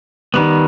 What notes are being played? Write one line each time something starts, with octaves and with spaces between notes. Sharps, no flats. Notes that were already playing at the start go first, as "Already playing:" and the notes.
D#3 G3 B3